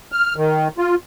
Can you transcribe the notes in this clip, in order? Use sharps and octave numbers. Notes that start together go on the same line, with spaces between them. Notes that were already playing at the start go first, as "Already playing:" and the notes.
F6
D#3
F4